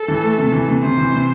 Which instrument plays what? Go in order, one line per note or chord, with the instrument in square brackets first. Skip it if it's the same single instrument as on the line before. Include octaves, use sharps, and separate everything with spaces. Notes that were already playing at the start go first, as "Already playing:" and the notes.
Already playing: [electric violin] A4
[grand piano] E3
A3
C3
E3
C3
[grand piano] C3 [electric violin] C5
[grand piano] E3
C3